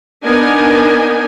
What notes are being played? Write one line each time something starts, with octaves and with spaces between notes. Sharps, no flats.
B3 D4 D#4 A#4 G#5